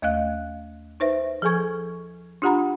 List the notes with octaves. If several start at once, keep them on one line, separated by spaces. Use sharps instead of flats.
D#2 A3 D#5 F5 F#6
D#4 B4 C5 E5
F3 G#4 A4 G#5 C#6 G#6
D4 F4 G4 F#5 A#5 B5